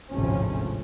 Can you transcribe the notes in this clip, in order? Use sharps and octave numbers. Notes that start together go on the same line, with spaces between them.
G#1 D2 A2 C3 F3 C#4